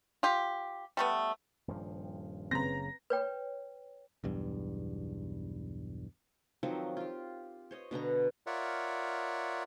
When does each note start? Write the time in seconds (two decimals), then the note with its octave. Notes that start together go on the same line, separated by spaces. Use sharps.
0.23 F4 G4
0.97 G3 A3 B3
1.68 D#1 G2 F3
2.51 F#1 A2 C#3 C4 B4 A#5 A#6
3.10 B4 C#5 G5
4.24 B1 E2 G2
6.63 D#3 F3 F#3 C4
6.97 F4 G4
7.71 C5 C#5 D#5
7.91 B2 D3 B3 A#5
8.47 F4 A#4 C#5 D5 E5 F#5